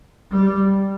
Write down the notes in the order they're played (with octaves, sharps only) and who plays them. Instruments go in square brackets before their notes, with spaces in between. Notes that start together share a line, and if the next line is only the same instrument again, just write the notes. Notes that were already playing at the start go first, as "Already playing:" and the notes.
[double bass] G3